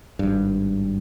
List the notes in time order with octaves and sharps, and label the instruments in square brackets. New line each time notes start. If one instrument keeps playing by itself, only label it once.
[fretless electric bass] G#1 G2